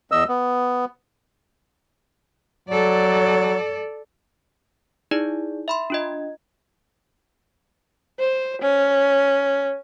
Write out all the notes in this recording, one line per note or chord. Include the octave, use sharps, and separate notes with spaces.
E2 D#5 E6
B3
F#3 A4 D5
D#4 E4 G#4 D5
E5 B5 C6
D4 F4 D#5
C5
C#4